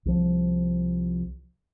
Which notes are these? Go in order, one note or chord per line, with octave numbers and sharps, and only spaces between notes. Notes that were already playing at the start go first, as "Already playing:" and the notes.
C2 F3